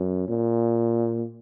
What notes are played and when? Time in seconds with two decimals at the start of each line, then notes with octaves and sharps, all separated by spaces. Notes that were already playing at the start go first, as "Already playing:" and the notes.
Already playing: F#2
0.28 A#2